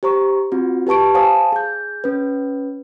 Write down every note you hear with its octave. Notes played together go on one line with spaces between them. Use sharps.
G4 C5 A#5 C#6
C4 F4 F#4
G4 B4 A5 C#6 D7
C5 F5 G#5 A5 D#6
G#4 G6
C#4 B4